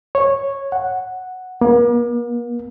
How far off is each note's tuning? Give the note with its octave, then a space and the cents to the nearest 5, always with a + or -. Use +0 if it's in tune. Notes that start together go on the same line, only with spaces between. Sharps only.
C#5 -10
F#5 +0
A#3 +45